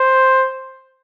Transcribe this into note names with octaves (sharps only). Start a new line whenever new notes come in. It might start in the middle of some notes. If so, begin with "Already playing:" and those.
Already playing: C5